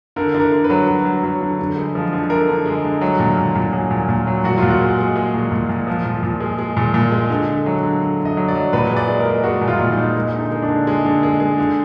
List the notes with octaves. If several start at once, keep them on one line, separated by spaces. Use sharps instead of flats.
D3 A#4
D3
A#4
D3
B4
F#3
F#3
F#3
F#3
D3
D3
G#3
F3
D3
D3 A#4
D3
G#3
D3
F#3
A#2
A#2
A#2
F#3 G#4
A#2
A#2
F#3
A#2 F#4
A#2 F4
F#4
G#3
G#3
G#3 G#4
A#2
A#2
A#2
F3
A#2
A#2
G#3
G#3
A#2
A#2
G#3
D3
D3
F#3
D3
D3
D3
D#5
F#3
D5
F#3
A#2 B4
G#3
D5
G#3
A#4
G#3
G#3 F#4
A#2
F4
A#2
D#4
A#2
G#3
D3 D#4
G#3
D4
D3
G#3
D3
G#3
G#3
D3